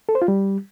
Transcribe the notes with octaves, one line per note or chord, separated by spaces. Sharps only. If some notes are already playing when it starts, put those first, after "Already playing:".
A4
C5
F4
G3